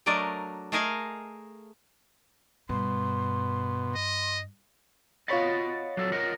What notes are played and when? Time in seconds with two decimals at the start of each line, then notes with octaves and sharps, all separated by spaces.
0.06 F#3 A3 D4 A#4 D5 D#5
0.72 A3 G#4 A#4 D#5 F5 G#5
2.69 G2 B2 C6
3.95 D#5
5.28 F4 C#5 D#5 F#5 B5 A6
5.97 F#3 A4
6.12 A#4 D#5 F#5